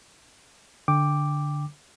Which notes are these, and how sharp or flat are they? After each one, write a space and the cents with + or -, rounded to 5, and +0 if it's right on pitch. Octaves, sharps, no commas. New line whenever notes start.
D3 +0 G5 +10 D6 +0